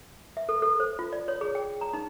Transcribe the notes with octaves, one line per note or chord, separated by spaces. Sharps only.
E5
A4
A4
C5
F4
D5
C#5
G#4
G5
A#5
D#4